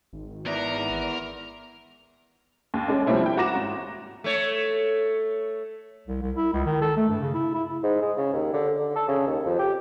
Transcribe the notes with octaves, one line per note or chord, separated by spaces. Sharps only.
G#1
B3 E4 A#4 D5
D#2
G#3 C#4 D4
F3 G3 A#3 C4 E4 C#5
E4 G5
F#4 A#5 D6 A#6 E7
G#1
A3 C#5
C2
C2
E4
C#2
D#3
A4
A3
G2
C#3
E4
E4
G#2
G#3
C#3
D#2
D3
D3
A4
C#3
D#2
F2
G4